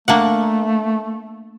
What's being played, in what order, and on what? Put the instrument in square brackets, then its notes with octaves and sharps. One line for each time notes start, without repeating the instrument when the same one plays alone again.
[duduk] A3 [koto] A#3 D4 F#5